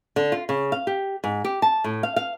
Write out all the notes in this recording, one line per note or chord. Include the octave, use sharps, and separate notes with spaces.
D3
F4
C#3
F5
G4
G#2
G4
A5
A2
F5
F5